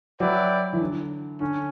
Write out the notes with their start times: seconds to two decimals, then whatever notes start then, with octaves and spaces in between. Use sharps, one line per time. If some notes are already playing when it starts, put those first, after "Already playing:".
0.20 F#3 E4 B4 D5 G5
0.73 E3
0.81 D3
1.40 D3 C#4